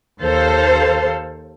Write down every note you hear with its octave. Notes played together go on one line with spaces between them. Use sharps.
D#2 A4 C5 F5